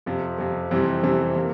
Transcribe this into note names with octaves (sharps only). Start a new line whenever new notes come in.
F2 C3 F3
F2 C3 F3
F2 C3 E3 G3 C4
F2 C3 E3 G3 C4
C3 E3 A#3